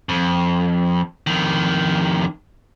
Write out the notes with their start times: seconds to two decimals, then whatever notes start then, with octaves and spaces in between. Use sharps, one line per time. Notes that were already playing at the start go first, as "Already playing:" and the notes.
0.09 F2
1.27 F2 D#3